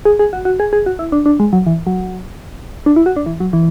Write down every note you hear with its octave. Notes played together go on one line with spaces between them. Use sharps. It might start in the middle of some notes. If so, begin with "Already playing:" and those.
G#4
G#4
F#4
F#4
G#4
G#4
F#4
E4
D4
D4
G#3
F#3
E3
F#3
D4
E4
F#4
D4
E3
F#3
E3